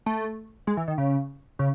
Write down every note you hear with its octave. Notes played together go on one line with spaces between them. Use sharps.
A3
G#3
E3
D#3
C#3
C#3